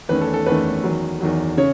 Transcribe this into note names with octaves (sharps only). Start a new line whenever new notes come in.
E2 D#3 A3 C#4 B4
A4
A4
E2 D#3 A3 C#4 B4
E2 D#3 F#3
E2 D#3 F#3
C#3 C#5